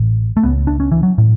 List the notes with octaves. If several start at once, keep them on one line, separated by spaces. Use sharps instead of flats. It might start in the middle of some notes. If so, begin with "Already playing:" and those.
Already playing: A1 A2
A3
C#2 C#3 B3
D4
C#4
E3
F#3
A2